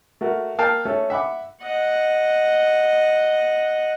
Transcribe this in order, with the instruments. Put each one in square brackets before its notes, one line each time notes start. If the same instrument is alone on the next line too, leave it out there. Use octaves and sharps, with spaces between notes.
[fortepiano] A3 F#4 A#4
A#3 F5 G5 A5
A3 C#4 A4
E5 F#5 B5 D6
[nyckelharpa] D#5 F#5